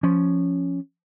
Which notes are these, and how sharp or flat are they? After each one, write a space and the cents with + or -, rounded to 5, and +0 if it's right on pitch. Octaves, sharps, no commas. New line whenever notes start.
F3 +0 C#4 +0